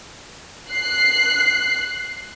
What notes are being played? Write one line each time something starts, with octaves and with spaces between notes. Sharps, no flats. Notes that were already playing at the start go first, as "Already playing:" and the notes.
F#6 C7